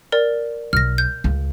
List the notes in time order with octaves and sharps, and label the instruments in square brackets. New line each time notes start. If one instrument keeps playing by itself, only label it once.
[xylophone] A#4 D5
[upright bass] B1 [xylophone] F6 A#6
[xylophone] G6
[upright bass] C#2